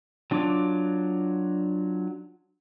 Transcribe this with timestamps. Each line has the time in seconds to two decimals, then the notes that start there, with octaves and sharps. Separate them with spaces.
0.31 F#3 D4 F4 D6